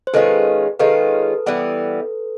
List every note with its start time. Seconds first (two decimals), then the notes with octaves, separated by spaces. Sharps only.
0.07 C5
0.14 D#3 G#3 C#4 F4 A4 B4
0.79 D#3 G#3 C#4 F4 A4 B4
1.46 E3 G3 B3